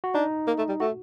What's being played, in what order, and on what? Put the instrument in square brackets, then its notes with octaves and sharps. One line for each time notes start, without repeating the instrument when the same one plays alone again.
[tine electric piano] F#4
[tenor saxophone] D4 [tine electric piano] D#4
[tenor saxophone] A#3
A3
G3
[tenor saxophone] A3 [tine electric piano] F#4